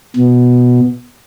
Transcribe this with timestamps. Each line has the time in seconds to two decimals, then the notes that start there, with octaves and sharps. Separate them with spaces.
0.16 B2